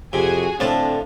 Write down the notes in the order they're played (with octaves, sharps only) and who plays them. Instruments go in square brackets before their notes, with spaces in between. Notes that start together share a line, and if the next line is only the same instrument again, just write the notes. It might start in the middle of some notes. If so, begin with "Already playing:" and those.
[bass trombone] F2 [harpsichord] C3 [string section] F#4 G#4 G#5
[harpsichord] A2 F3 [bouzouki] D3 A5 [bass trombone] C4 [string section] D4